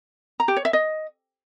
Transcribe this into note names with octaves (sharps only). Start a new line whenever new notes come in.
A#5
G4
C#5
E5
D#5